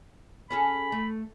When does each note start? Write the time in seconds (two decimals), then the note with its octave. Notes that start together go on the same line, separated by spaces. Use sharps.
0.50 C#4 G#4 A4 B5
0.92 A3